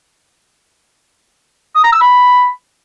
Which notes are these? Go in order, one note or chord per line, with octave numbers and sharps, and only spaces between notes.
D#6
A#5
E6
B5